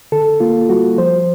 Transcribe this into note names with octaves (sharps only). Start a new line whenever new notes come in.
D3 A4
A#3 F4
G3 F#4
F3 C5